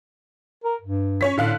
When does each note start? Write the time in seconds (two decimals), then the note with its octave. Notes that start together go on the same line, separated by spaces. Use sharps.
0.64 A#4
0.81 G2
1.21 C#4 C#5 B6
1.38 A2 D3 F5 F#6